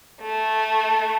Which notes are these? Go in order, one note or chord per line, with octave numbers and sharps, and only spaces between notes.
A3